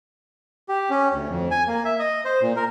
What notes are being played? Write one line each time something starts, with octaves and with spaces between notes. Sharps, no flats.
G4
C#4
D2
F2
G#5
A#3
E5
D#5
C5
A#2
A#4